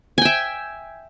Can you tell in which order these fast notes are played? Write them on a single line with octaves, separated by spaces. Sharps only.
G#5 G5 E5